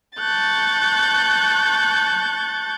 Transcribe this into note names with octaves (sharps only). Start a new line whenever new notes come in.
A5 C#6 F#6 G6 A6